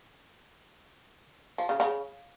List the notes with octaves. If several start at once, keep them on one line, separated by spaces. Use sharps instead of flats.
F3
C#3
C#3